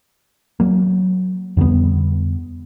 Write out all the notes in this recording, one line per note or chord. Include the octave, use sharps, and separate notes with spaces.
F#3 A#3
F2 D3 G3 B3